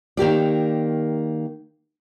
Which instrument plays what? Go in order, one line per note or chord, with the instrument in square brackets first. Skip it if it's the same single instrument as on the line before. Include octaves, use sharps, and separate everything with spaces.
[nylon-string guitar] D#3 A#3 G4 D5